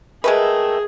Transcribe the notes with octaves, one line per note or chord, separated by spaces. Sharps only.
G#3 A3 G#4 A#4 B4 E5 G5